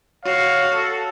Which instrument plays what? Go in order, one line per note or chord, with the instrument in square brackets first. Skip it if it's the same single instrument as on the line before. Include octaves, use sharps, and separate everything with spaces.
[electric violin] F#4 [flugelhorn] C#5 [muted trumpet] F5
[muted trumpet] A4